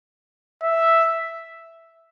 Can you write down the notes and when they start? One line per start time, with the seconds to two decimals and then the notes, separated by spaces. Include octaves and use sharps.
0.63 E5